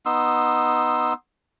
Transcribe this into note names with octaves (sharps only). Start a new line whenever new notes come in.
B3 D#4 C6 E6